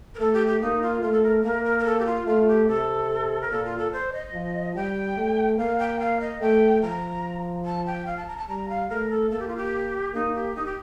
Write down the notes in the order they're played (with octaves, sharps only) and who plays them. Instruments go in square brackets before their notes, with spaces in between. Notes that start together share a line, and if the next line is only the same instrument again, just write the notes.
[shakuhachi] A#4
[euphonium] A3 [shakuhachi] A4
[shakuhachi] G4
G4
[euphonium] A#3 [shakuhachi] D#4
[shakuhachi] F4
[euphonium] A3 [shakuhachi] F4
[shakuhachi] A4
A#4
[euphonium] A#3 [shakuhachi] A#4
[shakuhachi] A#4
A#4
A4
G4
F4
[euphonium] A3 [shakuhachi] F4
[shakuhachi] G4
[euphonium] C3 [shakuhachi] A4
[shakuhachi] A#4
[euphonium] A#2 [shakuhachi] A4
[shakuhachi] F4
A4
C5
D#5
[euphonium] F3
[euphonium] G3 [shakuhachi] G5
[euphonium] A3
[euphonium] A#3 [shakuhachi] F5
[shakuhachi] G5
F5
D#5
[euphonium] A3 [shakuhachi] G5
[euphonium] F3 [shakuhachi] A#5
[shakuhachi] A5
G5
F5
A5
A#5
A5
[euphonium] G3 [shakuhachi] A#5
[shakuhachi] F5
[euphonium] A3 [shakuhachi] A#4
[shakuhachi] A4
[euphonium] A#3 [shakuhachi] A4
[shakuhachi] G4
F4
G4
[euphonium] A#3 [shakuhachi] D#4
[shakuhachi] G4
D#4
G4